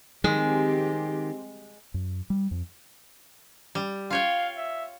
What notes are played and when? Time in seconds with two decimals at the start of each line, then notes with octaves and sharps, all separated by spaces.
0.24 D#3 G#3 C4 G4
1.94 F#2
2.30 G3
2.51 F2
3.75 G3
4.10 F4 C#5 F5 G5
4.57 E5